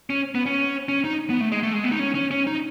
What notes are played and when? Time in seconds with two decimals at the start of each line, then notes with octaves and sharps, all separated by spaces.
0.10 C#4
0.35 B3
0.46 C#4
0.89 C#4
1.05 D#4
1.30 B3
1.41 A3
1.52 G#3
1.63 A3
1.73 G#3
1.84 B3
1.91 D#4
1.99 C#4
2.15 C#4
2.31 C#4
2.47 D#4